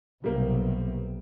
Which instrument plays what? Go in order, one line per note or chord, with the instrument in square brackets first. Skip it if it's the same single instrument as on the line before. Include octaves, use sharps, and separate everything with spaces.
[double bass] B1 C3 [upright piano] G3 A#3